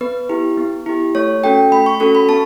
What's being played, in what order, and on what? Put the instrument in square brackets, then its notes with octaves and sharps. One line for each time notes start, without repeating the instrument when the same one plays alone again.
[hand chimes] B3 B4
E4 G4
B3
E4 G4
A3 C#5
C#4 F#4 A4 G5
A3 B5
C#6
C#4 F#4 A4 C#6
B5
B3 A5